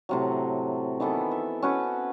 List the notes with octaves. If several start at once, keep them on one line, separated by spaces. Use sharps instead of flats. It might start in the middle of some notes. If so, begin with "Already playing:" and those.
A2 C3 F#3
D#3 E3 B3 A4
E5
C#4 F#4 B4